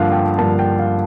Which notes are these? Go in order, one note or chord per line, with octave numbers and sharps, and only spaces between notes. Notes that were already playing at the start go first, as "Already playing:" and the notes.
Already playing: G2 D3 F3 A#3 F5
G5
G2 D3 F3 A#3 A5
G5
F5